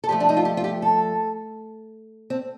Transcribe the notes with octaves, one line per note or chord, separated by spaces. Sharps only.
A4
G2 F3 A3 G4
D4
D#4
F4
G4
F4
G4
A4
C4